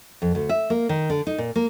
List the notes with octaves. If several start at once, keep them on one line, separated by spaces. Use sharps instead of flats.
F2
D2
E5
A#3
D#3
D3
D#4
A#2
A#3